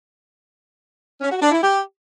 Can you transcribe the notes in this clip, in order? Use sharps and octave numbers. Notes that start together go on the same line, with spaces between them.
C#4
F#4
D4
E4
G4